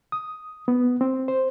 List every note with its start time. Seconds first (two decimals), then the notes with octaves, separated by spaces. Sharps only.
0.12 D#6
0.68 B3
1.01 C4
1.28 C5